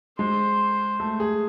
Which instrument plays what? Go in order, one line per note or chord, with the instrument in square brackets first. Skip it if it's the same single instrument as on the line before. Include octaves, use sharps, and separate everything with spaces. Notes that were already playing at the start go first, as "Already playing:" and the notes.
[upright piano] G#3 [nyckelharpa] C5
[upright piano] A3
G#4